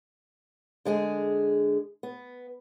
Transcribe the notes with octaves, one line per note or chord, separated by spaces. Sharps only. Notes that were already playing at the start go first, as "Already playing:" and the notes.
D3 G#3 G#4
B3